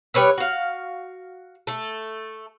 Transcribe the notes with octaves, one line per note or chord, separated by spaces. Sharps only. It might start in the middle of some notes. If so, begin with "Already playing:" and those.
G3 B4 C#5 E5
F#4 F5
A3 A4